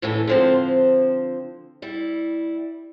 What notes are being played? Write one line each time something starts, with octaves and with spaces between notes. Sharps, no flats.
D#2 A2 E3 C#4 A4
D3 F3 C4
G3 E4